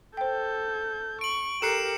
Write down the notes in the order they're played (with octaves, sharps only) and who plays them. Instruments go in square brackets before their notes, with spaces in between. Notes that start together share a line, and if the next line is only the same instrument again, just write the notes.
[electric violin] A4 G6 [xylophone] C5 G5
[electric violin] C#6 [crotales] D7 F#7
[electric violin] G4 A#4 [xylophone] A4 A#5 F#6 [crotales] C7 C#7 E7